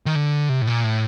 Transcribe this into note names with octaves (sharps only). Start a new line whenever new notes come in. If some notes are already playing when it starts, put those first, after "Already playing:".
D#3
D3
C3
A2
A#2
A2